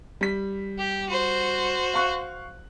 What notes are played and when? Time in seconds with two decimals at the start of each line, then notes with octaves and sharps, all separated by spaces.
0.21 G3 B6
0.78 G4
1.09 F#4 C5
1.94 F5 C#6 F#6